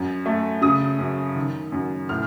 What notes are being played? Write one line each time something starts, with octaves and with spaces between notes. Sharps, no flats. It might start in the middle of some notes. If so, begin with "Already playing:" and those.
Already playing: F#2
A3
C#3 D#6
F#2
D#3
F#2
A2 F6